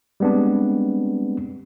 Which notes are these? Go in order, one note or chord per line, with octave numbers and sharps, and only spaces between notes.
G3 G#3 B3 C4 D4